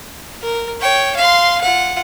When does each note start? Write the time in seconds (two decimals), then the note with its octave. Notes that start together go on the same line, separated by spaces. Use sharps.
0.42 A#4
0.81 C#5 G5
1.17 F5 C6
1.61 F4 F#5